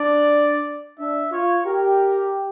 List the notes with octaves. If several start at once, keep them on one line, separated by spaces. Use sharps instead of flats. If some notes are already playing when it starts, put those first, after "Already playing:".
Already playing: D4 D5
D4 E5
F4 C#5
G4 A#4